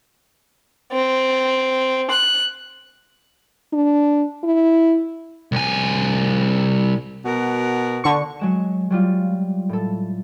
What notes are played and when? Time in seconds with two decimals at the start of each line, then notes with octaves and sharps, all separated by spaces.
0.92 C4
2.10 F#6
3.73 D4
4.44 E4
5.52 C2 G#5
7.23 B2 F#4 A#4
8.04 D3 C#6
8.39 F#3 G#3 E7
8.90 F#3 G3 F4
9.69 A2 A4